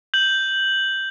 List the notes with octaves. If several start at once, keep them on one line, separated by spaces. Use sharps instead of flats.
G6 F#7